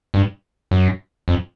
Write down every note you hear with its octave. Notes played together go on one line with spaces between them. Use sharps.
G2
F#2
F2